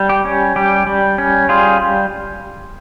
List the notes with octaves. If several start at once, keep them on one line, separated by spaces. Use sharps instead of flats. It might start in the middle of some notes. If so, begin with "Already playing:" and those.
Already playing: G3
G4
C#4
G3 G4
G3
C#4
G3 F4 G#4